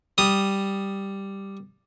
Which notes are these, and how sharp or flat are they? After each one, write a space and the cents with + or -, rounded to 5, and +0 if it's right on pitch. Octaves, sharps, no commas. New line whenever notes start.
G3 +0 D#6 +0